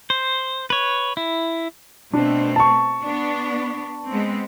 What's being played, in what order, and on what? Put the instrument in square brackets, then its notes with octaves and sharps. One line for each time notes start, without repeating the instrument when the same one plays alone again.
[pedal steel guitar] C5
B4 C#5
E4
[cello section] B2 A3 C4 [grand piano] D4
[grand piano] A5 C#6
[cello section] B3 D4
G#3 B3 C4